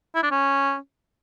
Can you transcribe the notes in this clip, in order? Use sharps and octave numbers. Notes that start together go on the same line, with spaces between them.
E4
D4
C#4